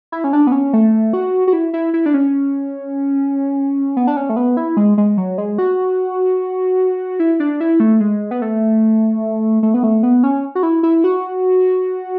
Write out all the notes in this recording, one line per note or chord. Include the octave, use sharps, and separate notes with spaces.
E4
C#4
D4
B3
C#4
A3
F#4
F#4
E4
E4
E4
D4
C#4
B3
D4
C#4
A3
B3
E4
G#3
G#3
F#3
G#3
F#4
E4
D4
E4
A3
G#3
B3
A3
A3
B3
A3
B3
C#4
F#4
E4
E4
F#4